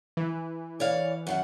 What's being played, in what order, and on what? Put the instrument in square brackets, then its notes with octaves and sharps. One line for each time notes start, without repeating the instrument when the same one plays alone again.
[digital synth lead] E3
[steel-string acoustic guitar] C#5 D5 F5
F#2 D#3 F#5